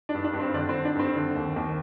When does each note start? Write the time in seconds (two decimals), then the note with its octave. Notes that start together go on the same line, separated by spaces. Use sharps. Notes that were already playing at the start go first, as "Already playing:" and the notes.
0.09 D4
0.14 G2
0.24 D4
0.34 G2
0.40 C4
0.54 D3 D4
0.69 C4
0.74 D3
0.85 D4
0.96 G2 C4
1.16 D3
1.36 D#2
1.56 D#2